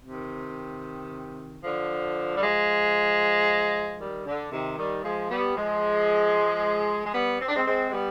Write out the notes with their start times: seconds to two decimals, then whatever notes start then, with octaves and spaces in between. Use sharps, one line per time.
0.06 C3 D#3
1.63 D3 F3
2.36 G3
2.42 F3 G#3
3.99 D#3 G3
4.26 D3
4.52 C3 D#3
4.78 D#3 G3
5.04 F3 G#3
5.30 G3 B3
5.57 F3 G#3
7.06 G#3
7.13 G3 B3
7.40 C4
7.49 D4
7.56 G#3 C4
7.67 G#3 C4
7.89 G#3
7.92 G3 B3